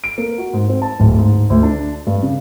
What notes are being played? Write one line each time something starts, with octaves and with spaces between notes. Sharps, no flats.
D7
A#3
F#4
G#2
C4
A5
D1
G#2
D2
D4
G2
C#3